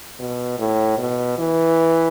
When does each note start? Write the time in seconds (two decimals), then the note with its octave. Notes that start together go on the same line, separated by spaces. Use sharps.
0.19 B2
0.59 A2
0.98 B2
1.39 E3